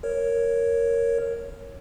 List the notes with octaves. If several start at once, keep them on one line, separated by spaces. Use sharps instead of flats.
A#4 C#5